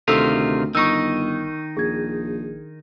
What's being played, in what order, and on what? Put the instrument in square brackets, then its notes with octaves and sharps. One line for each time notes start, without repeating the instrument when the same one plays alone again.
[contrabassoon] D2 [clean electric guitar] C3 D#3 F4 [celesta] A4 E6
[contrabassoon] G1 [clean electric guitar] D#3 D#4 [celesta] C#6 E6
[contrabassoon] A#1 [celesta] G#4 G#6